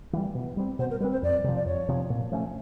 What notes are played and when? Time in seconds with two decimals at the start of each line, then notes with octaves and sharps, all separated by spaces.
0.13 E3 G3
0.35 B2
0.57 G3 C4
0.79 B2 C5
0.91 A#4
1.00 G3 B4
1.04 C4
1.12 C5
1.23 F2 D5
1.44 C3 F3
1.56 D5
1.66 F2 C#5
1.89 C3 F3
2.10 A#2
2.32 F3 A3 C#4